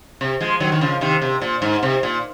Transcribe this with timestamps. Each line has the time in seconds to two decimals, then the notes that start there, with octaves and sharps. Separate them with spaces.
0.21 C3
0.41 F3 G#3
0.60 D#3 F#3
0.72 D#3
0.81 C#3 F3
1.01 C3 D#3
1.22 C3
1.41 A#2
1.62 G#2
1.83 C3
2.03 A#2